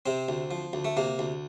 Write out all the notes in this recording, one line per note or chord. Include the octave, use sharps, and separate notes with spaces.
C3 C4
D2
F3
D2
A3
C3 A#3
D2